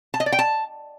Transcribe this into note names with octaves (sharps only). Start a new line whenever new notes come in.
A5
D#5
D5
G5
A5